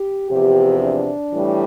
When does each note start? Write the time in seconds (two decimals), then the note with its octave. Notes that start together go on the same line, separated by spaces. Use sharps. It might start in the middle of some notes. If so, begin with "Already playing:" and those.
Already playing: G4
0.30 E2 C3 F3 G4
0.82 D4
1.32 A2 E3 G3